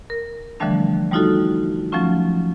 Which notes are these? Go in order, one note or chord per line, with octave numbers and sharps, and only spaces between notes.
A#4
D3 E3 F3 G3 A3 D4
G3 A3 D#4 F4 F#4 A4
F3 F#3 A3 C#4 F4